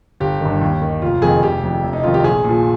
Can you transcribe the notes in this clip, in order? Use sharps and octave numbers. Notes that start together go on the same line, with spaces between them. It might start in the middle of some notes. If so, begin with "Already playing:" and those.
G1 G4
D#3
G2
D#2
D#3
F1 F4
F2 D#3 G#4
F1 G4
F2 C3
F1
D#4
F2 D#3 F4
G4
A#1 G#4
A#2 F3